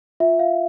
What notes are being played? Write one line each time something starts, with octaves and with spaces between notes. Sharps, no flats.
F4 E5
F5